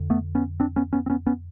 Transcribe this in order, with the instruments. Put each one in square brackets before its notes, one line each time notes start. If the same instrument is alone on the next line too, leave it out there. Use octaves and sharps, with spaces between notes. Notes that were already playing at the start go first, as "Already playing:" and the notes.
Already playing: [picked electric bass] F2 D3
A3 B3
B3 C#4
C4 D4
B3 C#4
B3 C#4
C4
B3 C#4
B3 C#4